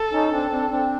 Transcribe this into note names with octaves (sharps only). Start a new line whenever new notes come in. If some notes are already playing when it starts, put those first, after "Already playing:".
Already playing: A4
C#4 D#4
C4 D4
C4 D4
C4 D4